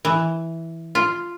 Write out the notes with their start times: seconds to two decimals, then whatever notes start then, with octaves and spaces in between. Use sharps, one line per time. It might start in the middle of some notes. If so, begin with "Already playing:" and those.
0.05 E3
0.95 F4